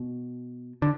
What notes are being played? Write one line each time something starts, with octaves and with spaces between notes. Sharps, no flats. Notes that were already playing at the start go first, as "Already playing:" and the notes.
Already playing: B2
D3